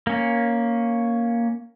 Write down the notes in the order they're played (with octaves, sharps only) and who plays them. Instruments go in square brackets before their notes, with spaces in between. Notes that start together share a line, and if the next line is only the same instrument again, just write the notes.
[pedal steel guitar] A#3 C#4